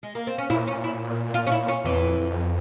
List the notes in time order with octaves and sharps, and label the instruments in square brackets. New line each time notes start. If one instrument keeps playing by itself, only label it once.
[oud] G#3
A#3
C4
C#4
[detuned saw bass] A#2 [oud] E4
[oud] C#4
E4
F4
C#4
E4
C#4
[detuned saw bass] F2 [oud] E3
[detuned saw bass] E2
F2